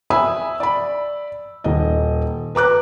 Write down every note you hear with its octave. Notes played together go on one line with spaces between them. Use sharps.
E5 G#5 B5 D#6 E6
D5 B5
D#1 D#5
B4 A#5 D6 F#6